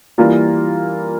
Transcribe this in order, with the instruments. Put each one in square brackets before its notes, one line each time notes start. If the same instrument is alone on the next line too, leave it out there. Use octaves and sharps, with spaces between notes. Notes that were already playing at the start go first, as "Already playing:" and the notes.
[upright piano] E3 G3 A#3 F4 A#4